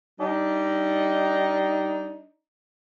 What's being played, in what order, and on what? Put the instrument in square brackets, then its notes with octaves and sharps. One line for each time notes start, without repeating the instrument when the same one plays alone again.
[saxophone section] G3 D4 D#4